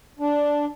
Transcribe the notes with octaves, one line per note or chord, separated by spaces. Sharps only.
D4